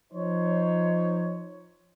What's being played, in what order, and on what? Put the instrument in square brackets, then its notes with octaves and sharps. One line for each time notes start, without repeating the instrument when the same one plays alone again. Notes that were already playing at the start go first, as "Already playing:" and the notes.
[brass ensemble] F3 D#4 C5 C#5